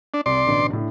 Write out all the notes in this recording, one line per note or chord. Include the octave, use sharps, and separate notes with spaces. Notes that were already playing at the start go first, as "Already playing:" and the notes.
D4
C2 D5 C6
A1 B2 D3
A2 D4